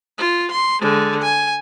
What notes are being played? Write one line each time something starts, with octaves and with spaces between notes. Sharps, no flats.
F4
C6
D3 G#3
G#5